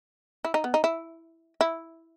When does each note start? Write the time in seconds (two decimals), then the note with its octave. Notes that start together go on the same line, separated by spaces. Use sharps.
0.45 E4
0.54 D#4
0.64 B3
0.74 D#4
0.84 E4
1.61 E4